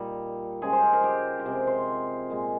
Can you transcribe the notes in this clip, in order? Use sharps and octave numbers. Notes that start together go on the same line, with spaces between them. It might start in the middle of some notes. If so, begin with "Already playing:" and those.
Already playing: A#2 G3 D#4
C#3 F3 G#3 G#4
C5
A#4
A#4
G4
G4
C3 F3 G#3 G#4
C5
A#2 G#3